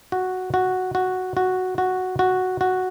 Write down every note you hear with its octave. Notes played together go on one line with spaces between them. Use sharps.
F#4
F#4
F#4
F#4
F#4
F#4
F#4